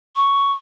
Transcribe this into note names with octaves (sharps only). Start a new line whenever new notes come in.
C#6